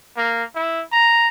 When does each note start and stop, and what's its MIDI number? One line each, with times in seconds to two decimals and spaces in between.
0.17 0.43 58
0.55 0.82 64
0.92 1.28 82